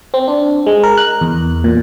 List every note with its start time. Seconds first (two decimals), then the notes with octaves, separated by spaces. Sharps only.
0.14 C4
0.28 D4
0.67 G#3
0.83 A#4
0.98 F#6
1.21 E2
1.64 A#2